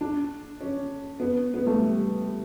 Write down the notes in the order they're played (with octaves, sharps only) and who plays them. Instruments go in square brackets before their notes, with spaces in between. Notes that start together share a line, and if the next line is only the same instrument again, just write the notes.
[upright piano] D4
C#4
B3
B3
A3
G3